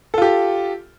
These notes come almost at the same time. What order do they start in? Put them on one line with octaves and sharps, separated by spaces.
A4 F4 G4